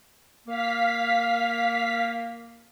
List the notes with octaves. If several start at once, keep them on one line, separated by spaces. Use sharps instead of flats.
A#3 F5 B6